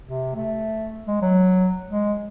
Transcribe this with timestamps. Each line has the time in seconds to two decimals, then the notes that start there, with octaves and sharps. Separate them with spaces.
0.04 C3
0.35 A3
1.07 G#3
1.22 F#3
1.89 G#3